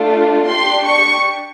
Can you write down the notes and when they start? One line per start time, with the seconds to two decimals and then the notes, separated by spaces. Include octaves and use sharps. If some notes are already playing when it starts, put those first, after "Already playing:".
Already playing: A3 D4 F4
0.47 D4 G4 C6
0.86 C#6